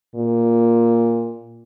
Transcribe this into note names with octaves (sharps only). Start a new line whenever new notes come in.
A#2